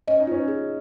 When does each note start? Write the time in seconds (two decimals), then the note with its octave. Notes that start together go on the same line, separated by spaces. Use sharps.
0.08 C#4 D#5
0.20 D#4
0.27 C#4 F4
0.48 G#4